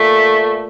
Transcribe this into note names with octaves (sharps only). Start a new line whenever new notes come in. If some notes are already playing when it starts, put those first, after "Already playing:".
Already playing: A#2 A3